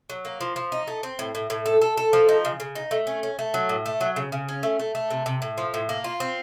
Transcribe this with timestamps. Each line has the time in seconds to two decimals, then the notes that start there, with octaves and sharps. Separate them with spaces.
0.10 F#3
0.25 A#3
0.41 F3
0.56 F3
0.72 D#4
0.87 A3
1.03 C4
1.19 A2
1.35 A2
1.50 A2
1.66 A4
1.82 A4
1.97 A4
2.13 F3
2.29 D#4
2.45 C#3
2.60 C#3
2.75 D#4
2.91 A3
3.07 C#4
3.23 C#4
3.39 A3
3.54 F#3
3.69 A2
3.86 A3
4.01 F#3
4.16 C#3
4.32 C#3
4.49 C#4
4.63 A3
4.79 A3
4.95 A3
5.11 C3
5.26 C3
5.42 A2
5.58 F3
5.74 A2
5.89 A#3
6.04 F4
6.20 C4